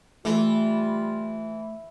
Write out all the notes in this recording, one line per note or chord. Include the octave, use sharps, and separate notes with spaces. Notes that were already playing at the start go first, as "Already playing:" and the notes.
E3 G3 A3 F4